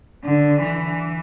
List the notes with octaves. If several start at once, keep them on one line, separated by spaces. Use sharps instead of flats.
D3
E3